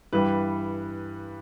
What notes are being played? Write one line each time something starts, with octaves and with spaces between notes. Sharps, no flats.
G2 E3 G3 B4